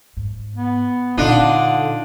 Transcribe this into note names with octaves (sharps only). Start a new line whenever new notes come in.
G#2
B3
A#2 D3 C4 D4 D#4 F4